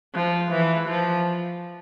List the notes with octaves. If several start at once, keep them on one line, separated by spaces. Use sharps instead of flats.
F3
E3
F3